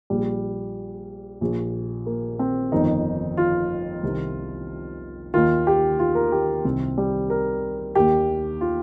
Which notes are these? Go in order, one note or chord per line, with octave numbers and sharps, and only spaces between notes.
A#1 A#2 G3
A#1 A#2
A#3
C4
G1 F2 D#3 D#4
F4
C2 C3 D#3
D#2 D#3 F4
G4
F4
A#4
G4
C2 C3 D#3 C4
G3
A#4
D#2 D#3 G4
F4